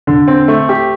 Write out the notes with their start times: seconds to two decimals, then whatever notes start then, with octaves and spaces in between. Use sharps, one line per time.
0.07 D3
0.28 C4
0.48 A3
0.69 G4